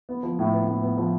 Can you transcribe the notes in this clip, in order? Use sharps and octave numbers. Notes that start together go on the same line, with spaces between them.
B3
F3
A2
B3
A2
B3
F3